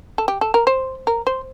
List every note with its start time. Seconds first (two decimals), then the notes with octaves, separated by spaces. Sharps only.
0.18 A4
0.28 G4
0.41 A4
0.54 A#4
0.67 C5
1.07 A#4
1.27 C5